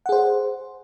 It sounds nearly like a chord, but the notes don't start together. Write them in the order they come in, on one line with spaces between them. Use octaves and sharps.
F#5 G#4 C5